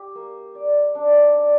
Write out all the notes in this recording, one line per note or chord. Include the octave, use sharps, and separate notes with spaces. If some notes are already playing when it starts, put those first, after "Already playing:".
Already playing: G4
A#3
D5
D4
D5